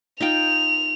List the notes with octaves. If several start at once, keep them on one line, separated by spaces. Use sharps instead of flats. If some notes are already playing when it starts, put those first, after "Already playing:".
D#4 F4 G5 F7